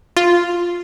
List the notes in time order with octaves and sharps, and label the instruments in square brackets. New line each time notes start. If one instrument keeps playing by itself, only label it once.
[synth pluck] F4